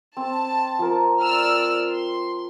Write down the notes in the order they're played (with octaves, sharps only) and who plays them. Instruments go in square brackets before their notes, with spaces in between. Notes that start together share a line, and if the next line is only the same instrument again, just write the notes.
[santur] C4 [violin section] A5
[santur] F3 A#4
[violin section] D5 E6 F6
C6